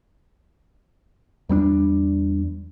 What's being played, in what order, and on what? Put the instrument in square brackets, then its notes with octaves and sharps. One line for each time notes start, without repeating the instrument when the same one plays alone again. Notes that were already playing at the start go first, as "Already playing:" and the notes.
[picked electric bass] E2 G3 C4 D4